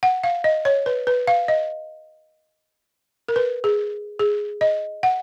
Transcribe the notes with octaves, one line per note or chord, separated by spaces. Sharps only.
F#5
F5
D#5
C#5
B4
B4
F5
D#5
A#4
B4
G#4
G#4
D#5
F#5